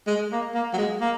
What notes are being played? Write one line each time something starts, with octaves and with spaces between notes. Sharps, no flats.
G#3
A#3
A#3
F#3
G#3
A#3